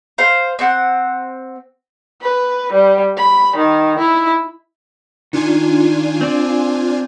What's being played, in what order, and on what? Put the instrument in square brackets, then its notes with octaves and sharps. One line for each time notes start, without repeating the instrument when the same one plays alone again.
[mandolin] C5 F5
C4 F#5
[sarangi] B4
G3
B5
D#3
E4
[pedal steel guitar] D#3 [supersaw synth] D4 F4 G#5
[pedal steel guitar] C4 D5